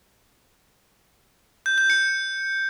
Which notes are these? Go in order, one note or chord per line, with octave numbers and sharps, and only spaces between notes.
G6
G6
C#7